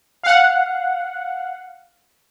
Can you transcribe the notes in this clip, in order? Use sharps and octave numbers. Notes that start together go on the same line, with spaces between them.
F5 F#5